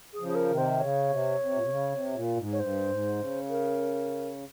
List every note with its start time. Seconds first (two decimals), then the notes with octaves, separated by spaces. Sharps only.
0.13 G#4
0.20 C#3 F3
0.28 G#4
0.35 A#4
0.50 C3 D#3
0.58 C5
0.80 C#3 C#5
1.10 C3
1.40 C3
1.55 A#2
1.62 C3
1.69 C#3
1.92 C3
2.14 A#2
2.37 G#2
2.52 C#5
2.59 G2 C5
2.89 G#2
3.19 C#3
3.48 A#4